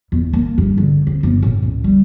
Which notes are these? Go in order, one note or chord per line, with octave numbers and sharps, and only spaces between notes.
E2
A#3
G2
D3
C4
G1
A2
C#2
G3